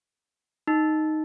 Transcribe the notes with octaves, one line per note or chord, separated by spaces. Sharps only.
D#4